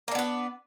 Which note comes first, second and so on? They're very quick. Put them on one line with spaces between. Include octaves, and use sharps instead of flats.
A#3 D4 B3 B4